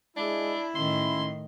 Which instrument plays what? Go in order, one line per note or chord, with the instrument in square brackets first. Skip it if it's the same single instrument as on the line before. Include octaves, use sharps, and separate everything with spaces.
[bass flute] G#3 [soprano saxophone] D4 [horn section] E4
[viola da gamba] A2 D#3 [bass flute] C#4 [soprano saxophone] C6